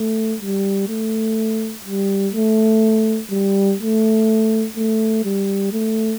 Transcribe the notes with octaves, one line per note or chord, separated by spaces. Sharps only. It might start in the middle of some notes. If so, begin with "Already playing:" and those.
Already playing: A3
G3
A3
G3
A3
G3
A3
A3
G3
A3